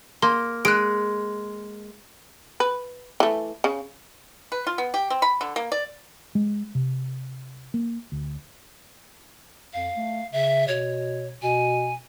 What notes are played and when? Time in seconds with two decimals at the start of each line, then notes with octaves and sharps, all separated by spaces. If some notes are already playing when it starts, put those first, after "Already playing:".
0.22 A#3 C6
0.65 G#3 F#6 D7
2.60 B4
3.20 E3 A3
3.64 C#3
4.52 B4
4.67 F4
4.78 B3
4.94 G4
5.10 C4
5.22 B5
5.41 D3
5.56 A#3
5.72 D5
6.35 G#3
6.75 C3
7.74 A#3
8.12 D2
9.73 F2 F5
9.96 A3
10.32 C#3 E5
10.68 B2 C#5
11.42 B2 G#5